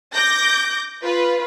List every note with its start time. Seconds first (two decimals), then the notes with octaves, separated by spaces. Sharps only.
0.14 D6 G6 A#6
1.03 F4 B4